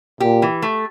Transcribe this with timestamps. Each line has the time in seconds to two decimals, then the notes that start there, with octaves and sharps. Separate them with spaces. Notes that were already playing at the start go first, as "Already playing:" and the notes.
0.20 A#2 G4
0.42 E3
0.62 A3